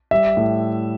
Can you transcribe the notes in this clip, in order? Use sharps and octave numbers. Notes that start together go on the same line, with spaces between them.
G3 E5
A2